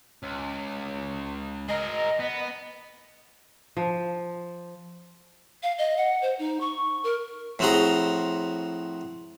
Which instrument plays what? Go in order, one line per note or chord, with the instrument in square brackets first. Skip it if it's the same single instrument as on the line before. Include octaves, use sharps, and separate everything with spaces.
[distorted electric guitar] C#2
[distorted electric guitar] G#4 A#4 [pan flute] D#5
[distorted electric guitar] B3
[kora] F3
[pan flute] F5
D#5
F#5
C5
D#4
C#6
A#4
[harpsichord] A2 F3 C4 F#4 G#4 A#5